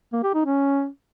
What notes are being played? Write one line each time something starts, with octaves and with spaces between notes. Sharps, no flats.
A#3
G4
D#4
C#4